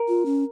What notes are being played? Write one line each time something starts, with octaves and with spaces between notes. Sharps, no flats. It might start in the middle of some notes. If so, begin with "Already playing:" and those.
Already playing: A#4
F4
C#4